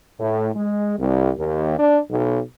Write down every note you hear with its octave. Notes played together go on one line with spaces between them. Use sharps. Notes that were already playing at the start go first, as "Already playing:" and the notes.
A2
G#3
C2
D#2
D4
B1